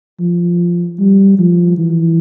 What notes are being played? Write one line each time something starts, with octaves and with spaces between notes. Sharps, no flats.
F3
G3
F3
E3